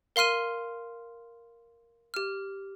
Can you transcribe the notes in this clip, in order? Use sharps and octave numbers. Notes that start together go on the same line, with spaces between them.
A#4 F5 C6 F6 D#7
G4 F6